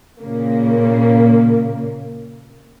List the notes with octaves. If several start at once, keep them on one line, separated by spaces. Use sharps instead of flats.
A#2 C#3 A#3